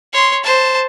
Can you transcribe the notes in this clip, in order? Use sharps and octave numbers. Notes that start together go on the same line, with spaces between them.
C#5 C6
C5 A5